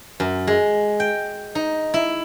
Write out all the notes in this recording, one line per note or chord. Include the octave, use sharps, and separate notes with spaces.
F#2
G#3
G5
D#4
E4